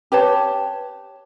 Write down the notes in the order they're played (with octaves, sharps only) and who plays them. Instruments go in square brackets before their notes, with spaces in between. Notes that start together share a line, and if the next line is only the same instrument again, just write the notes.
[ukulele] G4 B4 C#5 A5